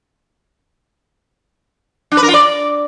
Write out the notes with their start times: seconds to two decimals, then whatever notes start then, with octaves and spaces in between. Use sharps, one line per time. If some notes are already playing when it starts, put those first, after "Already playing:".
2.12 D4
2.17 B4
2.23 A#4
2.28 F4
2.34 D5